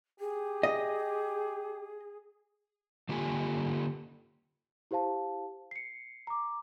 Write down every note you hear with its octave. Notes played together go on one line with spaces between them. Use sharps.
G4 G#4
D#5
D3 A#3 F4 G4 A4 G#5
E4 G4 C5 F5 A5
C7 C#7
A#5 D6